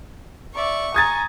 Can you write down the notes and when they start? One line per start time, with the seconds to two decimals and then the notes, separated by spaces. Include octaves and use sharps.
0.55 D5 E5 C#6
0.94 G#5 A#5 D#6 G#6 A6